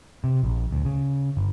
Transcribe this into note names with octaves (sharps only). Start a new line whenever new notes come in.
C3
A#1
D2
C#3
G1